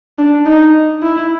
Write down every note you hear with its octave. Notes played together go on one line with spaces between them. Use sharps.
D4
D#4
E4